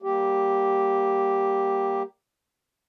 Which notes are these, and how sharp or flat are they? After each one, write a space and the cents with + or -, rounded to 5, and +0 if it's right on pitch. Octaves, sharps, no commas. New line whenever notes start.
G3 -5 A#3 +0 G4 +0